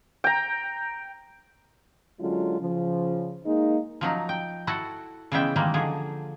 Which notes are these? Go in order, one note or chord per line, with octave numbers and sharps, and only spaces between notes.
G5 A#5
D3 F#3 G#3 C#4 F4
C#3 F3
G#3 A#3 D#4
F3 F#3 D#4
G5
E4 F#4 A4 F#5
C#3 E3 G#3 B3 E5 G5
D#3 E3 G3 G#3 A#3
D3 F3 G#4